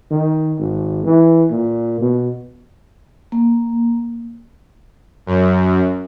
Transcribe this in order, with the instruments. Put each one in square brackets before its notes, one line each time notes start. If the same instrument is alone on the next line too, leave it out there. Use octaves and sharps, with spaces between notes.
[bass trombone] D#3
G#1
E3
A#2
B2
[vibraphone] A#3
[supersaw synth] F#2